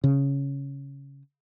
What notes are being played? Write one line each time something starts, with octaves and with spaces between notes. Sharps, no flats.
C#3